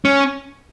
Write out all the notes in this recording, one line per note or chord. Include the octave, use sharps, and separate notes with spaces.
C#4